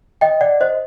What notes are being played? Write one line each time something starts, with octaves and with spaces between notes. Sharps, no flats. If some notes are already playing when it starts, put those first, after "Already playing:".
D#5 G5
D5 F#5
C5 D#5